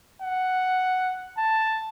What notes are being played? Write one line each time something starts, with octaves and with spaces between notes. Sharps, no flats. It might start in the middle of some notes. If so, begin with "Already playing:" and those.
F#5
A5